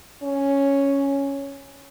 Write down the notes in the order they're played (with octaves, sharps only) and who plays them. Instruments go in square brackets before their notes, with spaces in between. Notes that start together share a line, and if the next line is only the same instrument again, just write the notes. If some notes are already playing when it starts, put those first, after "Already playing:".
[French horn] C#4